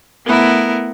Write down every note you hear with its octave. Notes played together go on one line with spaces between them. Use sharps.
A3 B3 E4 A#4